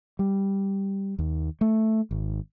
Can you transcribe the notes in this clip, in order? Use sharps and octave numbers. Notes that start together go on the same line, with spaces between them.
G3
D#2
A3
G#1